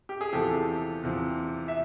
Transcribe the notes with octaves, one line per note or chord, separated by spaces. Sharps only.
G4
G#4
E2 C3 F3 G4 A4
E2 C3 F3
E5